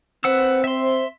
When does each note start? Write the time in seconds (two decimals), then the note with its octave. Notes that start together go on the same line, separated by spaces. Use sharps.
0.24 C4 B4 C5 F#5 E6
0.64 E5 C6